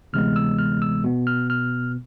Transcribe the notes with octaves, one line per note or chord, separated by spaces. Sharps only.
D2 C3 E3 G#3 B3 F6
E6
F6
E6
B2 B3
F6
F6